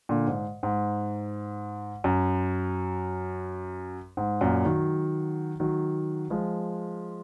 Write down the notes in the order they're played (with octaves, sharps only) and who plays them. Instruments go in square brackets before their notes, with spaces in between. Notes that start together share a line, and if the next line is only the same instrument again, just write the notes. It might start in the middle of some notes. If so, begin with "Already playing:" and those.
[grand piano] A#2 D3
G#2
G#2
F#2
G#2
F#2 A#2
D#3 F#3
D#3 F#3
F3 G#3